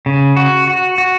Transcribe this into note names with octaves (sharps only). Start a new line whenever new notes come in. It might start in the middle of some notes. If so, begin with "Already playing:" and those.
C#3
F#4
F#4
F#4